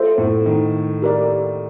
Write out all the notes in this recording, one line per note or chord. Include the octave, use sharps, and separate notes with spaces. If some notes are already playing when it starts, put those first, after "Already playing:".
Already playing: F4 A4 C5 E5
A2
D#3
G4 A#4 D5